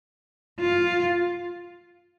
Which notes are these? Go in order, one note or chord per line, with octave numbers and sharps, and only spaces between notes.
F4